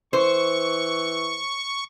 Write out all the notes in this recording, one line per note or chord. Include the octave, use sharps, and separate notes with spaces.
E3 C5 C#6